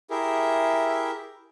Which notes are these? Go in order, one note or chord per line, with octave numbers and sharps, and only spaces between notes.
E4 G4 G#4 A#4 E5